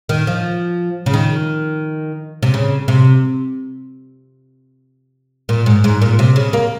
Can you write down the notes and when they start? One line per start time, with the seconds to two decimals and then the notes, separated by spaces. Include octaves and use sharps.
0.09 D#3
0.27 F3
1.06 C#3
1.14 D#3
2.43 C3
2.54 C#3
2.88 C3
5.49 A#2
5.66 G#2
5.84 G#2
6.02 A#2
6.19 C3
6.36 C#3
6.53 A#3